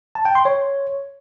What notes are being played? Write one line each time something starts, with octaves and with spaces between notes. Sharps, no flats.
A5
G5
C6
C#5